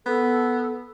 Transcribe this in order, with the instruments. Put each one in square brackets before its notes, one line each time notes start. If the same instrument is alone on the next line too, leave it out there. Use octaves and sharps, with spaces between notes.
[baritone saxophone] B3 [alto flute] A4